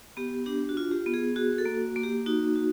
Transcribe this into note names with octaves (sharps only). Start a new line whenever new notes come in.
B3 G4
D4 G4
F#4
F4
G4
B3
G#4
F#4 G#4
A4
A#3
A#3
G4
D#4 F#4
F#4